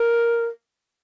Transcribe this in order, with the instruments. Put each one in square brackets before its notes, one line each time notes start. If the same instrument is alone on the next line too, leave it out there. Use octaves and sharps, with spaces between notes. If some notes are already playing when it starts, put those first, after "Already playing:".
Already playing: [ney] A#4